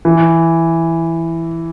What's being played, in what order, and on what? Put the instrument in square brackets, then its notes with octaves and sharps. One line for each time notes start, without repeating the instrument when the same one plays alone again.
[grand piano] E3